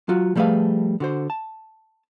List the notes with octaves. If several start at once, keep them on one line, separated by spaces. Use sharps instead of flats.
F#3 F4 F#4
F3 G3 A3 G#4 B4 F5
D3 F#4 C5
A5